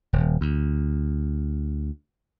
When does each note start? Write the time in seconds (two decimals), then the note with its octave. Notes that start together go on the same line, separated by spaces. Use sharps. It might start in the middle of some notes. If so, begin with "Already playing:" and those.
0.13 D#1
0.41 D2